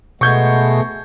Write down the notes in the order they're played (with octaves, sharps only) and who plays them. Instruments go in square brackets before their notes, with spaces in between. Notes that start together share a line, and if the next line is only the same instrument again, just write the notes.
[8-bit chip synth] B2 [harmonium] G#3 A3 B3 [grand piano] C#6 G6 G#6